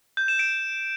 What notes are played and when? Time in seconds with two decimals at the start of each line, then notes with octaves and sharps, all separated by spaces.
0.17 G6
0.28 E7
0.39 D7